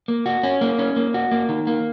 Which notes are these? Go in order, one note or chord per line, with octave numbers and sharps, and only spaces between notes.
A#3
F#4
C#4
A#3
C#4
A#3
F#4
A#3
D#3
A#3